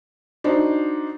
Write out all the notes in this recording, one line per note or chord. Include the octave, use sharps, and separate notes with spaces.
D4 D#4 F#4 C5